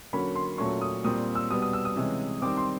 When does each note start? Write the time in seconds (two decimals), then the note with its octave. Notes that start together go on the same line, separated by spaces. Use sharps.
0.13 D3 F#3 A#3 C#4 B5
0.35 C6
0.58 A#2 F#3 A3 C#4 C#6
0.81 D#6
1.04 A#2 G3 C4 D#6
1.35 E6
1.50 B2 G3 B3 D#6
1.62 D#6
1.73 E6
1.85 D#6
1.96 C3 E3 G#3 C#4
2.42 D#3 G3 C4 D6
2.57 C6